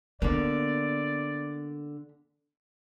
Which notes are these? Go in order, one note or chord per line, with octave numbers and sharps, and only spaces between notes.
D3 A#3 B3 D5